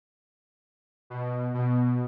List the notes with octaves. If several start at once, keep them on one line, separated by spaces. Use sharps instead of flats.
B2
B2